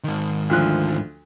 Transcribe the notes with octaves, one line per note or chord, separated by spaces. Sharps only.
G#2 D#3
D2 F3 F#6